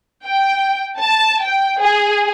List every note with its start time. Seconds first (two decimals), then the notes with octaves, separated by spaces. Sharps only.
0.25 G5
1.00 A5
1.43 G5
1.81 G#4